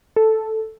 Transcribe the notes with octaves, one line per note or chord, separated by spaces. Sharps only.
A4